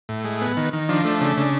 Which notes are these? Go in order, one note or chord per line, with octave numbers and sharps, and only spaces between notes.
A2
G#3
B3
D#3
D#3
F3 D4
A3
C#3
C#3